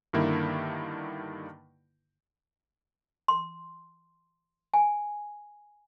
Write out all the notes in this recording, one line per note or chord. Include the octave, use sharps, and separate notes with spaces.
G2 D3 D#3 A#3 E4
C6
G#5